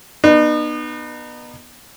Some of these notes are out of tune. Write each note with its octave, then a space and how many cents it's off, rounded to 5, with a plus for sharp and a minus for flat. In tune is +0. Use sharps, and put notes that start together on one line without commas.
B3 -20 D#4 -40